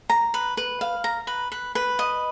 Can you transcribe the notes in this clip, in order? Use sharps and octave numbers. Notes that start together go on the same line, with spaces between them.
A#5
B4
B4
F5
A#5
B4
B4
B4
D#5